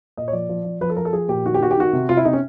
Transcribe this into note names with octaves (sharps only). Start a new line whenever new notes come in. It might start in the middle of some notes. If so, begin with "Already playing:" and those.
A#2 D#5
C#5
F3 D5
F3
F3
F3 B4
A4
F3 A#4
A4
F3 G#4
A#2 G4
D#3 F#4
G4
D#3 F#4
G4
D#3 F#4
C3
C3 F4
E4
C3 D#4
C#4